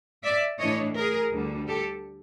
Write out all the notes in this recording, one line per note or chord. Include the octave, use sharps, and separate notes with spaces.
D5 E5
A2 E3 A3 D4 C#5 D#5
G#4 A#4
D2 D3 G3
G4 A4